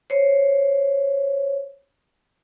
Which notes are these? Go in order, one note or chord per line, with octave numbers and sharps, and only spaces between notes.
C5 C#5